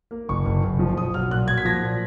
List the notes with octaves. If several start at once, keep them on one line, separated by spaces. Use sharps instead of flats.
A#3
F#1 C#6
F#1
F#1
F3
B1 D#6
F#3 F6
A#2 F#6
F#3 G#6
B6
F3 A#6
A#2